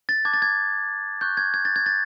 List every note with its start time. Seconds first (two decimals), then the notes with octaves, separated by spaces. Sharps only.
0.09 A6
0.25 A5 D6 F#6 G#6
0.34 A6
0.42 G#6
1.21 C#6 F#6 G6
1.37 G#6
1.54 G#6
1.65 A6
1.76 G#6
1.86 A6